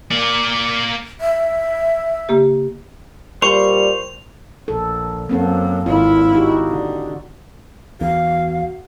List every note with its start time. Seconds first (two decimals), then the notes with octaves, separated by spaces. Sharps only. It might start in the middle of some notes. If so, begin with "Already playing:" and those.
0.11 A#3 D5
1.21 E5
2.29 C#3 A#3 G4
3.42 A#2 G3 C5 C6 C#6 F7
4.68 A#1 A4
5.29 F#2 A#3 C4 A4
5.86 G#1 E4 F4
6.33 D#4 F#4 G4
6.68 D3
8.01 E2 F#4 F5